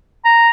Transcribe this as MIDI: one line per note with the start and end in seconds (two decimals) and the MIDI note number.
0.24 0.50 82